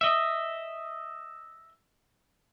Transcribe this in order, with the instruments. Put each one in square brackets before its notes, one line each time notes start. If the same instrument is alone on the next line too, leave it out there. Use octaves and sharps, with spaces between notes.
[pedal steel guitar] D#5 E5